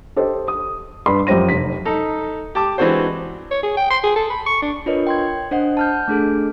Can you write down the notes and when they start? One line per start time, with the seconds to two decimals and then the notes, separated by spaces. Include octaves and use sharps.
0.16 G4 A4 C5 D#5
0.48 D#6
1.06 G2 B4 B5 C6
1.27 F#2 F3 G4 C5 A#6 D#7
1.48 F1 B6
1.85 D#4 A4
2.55 G4 A5 D6
2.78 E3 G#3 C4 D4 F#4 C5
3.51 C#5
3.63 G#4
3.77 G5
3.90 C6
4.03 G#4
4.16 A4
4.30 B5
4.46 C#6
4.62 D4
4.86 D4 F4 A#4 B4 C#5 D#5
5.07 G5 C6 G#6
5.51 D4 C5 D#5 F#5
5.77 A5 F6 G6
6.08 A3 D4 G#4 A4